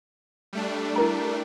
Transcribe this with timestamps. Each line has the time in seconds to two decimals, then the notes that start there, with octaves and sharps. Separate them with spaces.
0.53 G3 A3 D4
0.96 E4 A#4 A#5